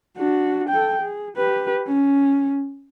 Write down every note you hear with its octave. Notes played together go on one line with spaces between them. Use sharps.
D4 F#4
A4 G5
G#4
G4 B4
C#4